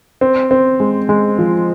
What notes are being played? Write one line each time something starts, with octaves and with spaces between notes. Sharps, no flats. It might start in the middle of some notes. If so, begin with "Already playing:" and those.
C4
C4
G#3
G#3
F3